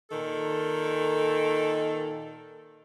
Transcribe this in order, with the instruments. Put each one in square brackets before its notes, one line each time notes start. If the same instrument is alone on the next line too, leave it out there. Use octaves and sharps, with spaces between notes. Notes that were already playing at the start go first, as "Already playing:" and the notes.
[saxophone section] A#2 D#3 A4